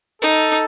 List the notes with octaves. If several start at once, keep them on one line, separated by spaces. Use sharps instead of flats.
D#4 A4